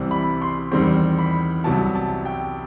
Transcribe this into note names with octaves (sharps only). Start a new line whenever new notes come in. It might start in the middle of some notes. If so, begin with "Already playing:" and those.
Already playing: C2 C3 E3 G3 C4
B5
C6
E2 D#3 G3 C4 C6
B5
C2 C3 F#3 B3 A5
A5
G5